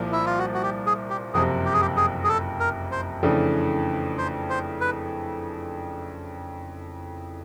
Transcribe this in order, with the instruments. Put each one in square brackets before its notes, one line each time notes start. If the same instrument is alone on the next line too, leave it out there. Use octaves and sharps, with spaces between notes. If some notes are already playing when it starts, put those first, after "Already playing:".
Already playing: [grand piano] C2 A#2 F3
[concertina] E4
F4
F#4
F#4
G4
G#4
G4
[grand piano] F#1 F2 C3 [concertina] G#4
[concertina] G4
G#4
G4
G#4
G#4
A4
A#4
C5
[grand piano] F2 C#3 E3 A3 D4
[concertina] C5
C5
B4